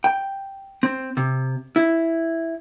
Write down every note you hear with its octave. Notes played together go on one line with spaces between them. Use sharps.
G5
C4
C3
E4